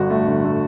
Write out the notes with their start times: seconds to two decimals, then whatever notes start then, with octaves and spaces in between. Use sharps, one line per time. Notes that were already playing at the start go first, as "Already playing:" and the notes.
Already playing: G1 D3 F#4
0.10 A3
0.27 G1
0.44 A3